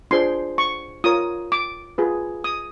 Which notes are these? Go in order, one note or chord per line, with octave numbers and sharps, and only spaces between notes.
D4 F4 G#4 C5 C6
C#6
F4 A#4 C#5 D#6
D6
F4 G#4 B4
D#6